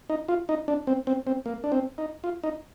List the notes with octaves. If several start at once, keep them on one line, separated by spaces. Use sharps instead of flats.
D#4
F4
D#4
D4
C4
C4
C4
A#3
D4
C4
D#4
F4
D#4